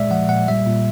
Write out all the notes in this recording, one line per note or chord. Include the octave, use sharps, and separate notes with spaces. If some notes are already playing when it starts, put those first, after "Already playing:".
Already playing: A#2 G#3 D5 E5
F3 F#5
A#2 F#5
G3 E5
A#2